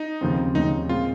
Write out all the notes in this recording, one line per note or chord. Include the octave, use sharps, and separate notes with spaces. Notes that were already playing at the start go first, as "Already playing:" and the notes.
Already playing: D#4
D#2 C#3 F3 C4
D#2 C#3 F3 C4 D#4
A#2 G#3 C4 F4